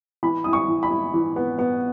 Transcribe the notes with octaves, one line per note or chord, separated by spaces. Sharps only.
E3 B5
E4 D#6
C#6
E3
B5
E4
E3
B3
B3